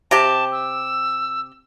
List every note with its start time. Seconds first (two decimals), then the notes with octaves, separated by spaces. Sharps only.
0.11 C3 G4 A5
0.52 E6